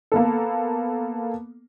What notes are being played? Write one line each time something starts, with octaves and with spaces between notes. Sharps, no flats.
A#3 B3 A4